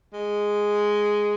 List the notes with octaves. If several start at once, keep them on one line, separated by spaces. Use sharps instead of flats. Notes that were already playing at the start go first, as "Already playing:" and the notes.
G#3